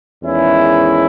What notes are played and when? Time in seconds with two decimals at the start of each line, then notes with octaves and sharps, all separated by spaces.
0.23 E2 D#3 G#3 C#4 E4